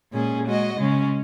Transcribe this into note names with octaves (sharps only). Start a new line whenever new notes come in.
A#2 G#3 C#4 G#4
G#3 F#4 D#5
C#3 G#3 C#4